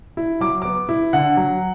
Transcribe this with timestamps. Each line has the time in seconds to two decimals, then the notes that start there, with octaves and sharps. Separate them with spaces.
0.17 E4
0.40 F#3 D6
0.62 B3 D6
0.89 E4
1.13 D3 F#5
1.37 F#3